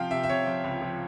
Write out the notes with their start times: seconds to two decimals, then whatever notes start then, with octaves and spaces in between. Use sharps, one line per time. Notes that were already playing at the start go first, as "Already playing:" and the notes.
Already playing: C3 F3 F5 G5
0.11 C3 E5
0.24 E5
0.30 C3 C#5
0.47 F3
0.64 C#2
0.82 F3